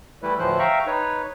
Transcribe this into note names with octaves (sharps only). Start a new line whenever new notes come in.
E3 G3 A3 E4 B4
D2 A2 E3 F3 C5 F#6
E5 F5 G5 A#5 C#6
D#4 B4 C#5